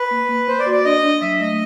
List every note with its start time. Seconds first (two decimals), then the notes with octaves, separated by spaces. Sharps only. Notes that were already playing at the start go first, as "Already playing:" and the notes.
Already playing: B4
0.11 A#3
0.29 A#3
0.48 A#3 C5
0.59 D5
0.66 F#4
0.72 D5
0.85 D4 D#5
1.03 D4
1.22 F#3 E5
1.40 A3 D#5